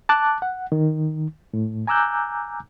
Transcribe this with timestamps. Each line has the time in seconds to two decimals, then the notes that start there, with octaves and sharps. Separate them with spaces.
0.09 A5 D6 F#6
0.42 F#5
0.72 D#3
1.54 A2
1.87 G#5 A#5 D6 E6 F#6 G6